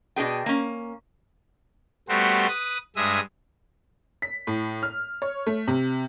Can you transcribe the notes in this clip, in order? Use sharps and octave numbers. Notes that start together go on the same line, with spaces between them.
B2 D4 G#4 G5
A#3 C#4
G3 A3 B3 F#4 G4 C5
B4 D#6
G2 G#3 E5 D#6
B6
A2
F6
C#5
A3
C3